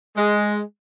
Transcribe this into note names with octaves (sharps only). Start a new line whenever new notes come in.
G#3